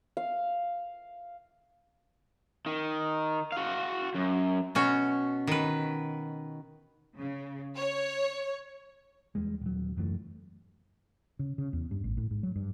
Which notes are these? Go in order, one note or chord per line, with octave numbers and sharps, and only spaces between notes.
F5
D#3
F#4 F5
F#2
B2 C#4 F#4
D#3 B4
C#3
C#5
E2 G3 G#3
D#1 F#3
F#1 F#2 E3 A3
C#3
C#3
E2
G2
A1
A2
G#2
F#3
G2